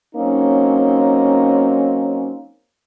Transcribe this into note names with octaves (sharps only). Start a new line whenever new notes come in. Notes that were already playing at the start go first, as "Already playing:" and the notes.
F#3 A#3 C4 C#4 D#4